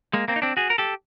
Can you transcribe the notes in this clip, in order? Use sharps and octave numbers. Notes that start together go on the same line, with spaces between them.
G#3 A#3
A#3 C4
D#4
C4 D4
F#4 G#4
A#4
G4 A4